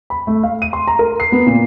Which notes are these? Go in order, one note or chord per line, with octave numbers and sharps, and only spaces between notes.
B5
A3
F5
D#7
C6
A#5
A#4
C7
B3
A#2